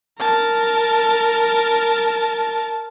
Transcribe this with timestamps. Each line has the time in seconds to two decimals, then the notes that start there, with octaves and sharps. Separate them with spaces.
0.19 A#4 A5